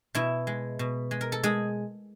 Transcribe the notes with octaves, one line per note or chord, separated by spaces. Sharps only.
B2 E4
G#3
B2
G#3
A#4
A4
G#3 G#4